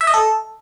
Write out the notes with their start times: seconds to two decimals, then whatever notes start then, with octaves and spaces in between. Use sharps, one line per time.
0.01 E5
0.07 D#5
0.14 A4